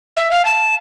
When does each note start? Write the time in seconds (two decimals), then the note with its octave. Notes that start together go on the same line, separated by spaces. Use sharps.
0.17 E5
0.31 F5
0.45 A5